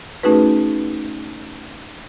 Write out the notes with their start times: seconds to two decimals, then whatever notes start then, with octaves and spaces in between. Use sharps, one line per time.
0.23 A3 C#4 D#4 F#4 G#4 B4